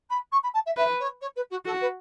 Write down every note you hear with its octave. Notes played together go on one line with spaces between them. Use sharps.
B5
C#6
B5
A5
E5
B4 E5
C#5
C#5
B4
F#4
F#4 A4
B4